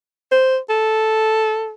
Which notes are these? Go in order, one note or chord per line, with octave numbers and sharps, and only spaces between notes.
C5
A4